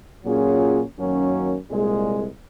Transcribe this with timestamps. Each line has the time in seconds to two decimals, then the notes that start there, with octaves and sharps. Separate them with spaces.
0.25 A#2 F#3 C#4 F4 G#4
0.97 F#2 D#3 F#3 A#3 C#4
1.69 C2 A#2 G#3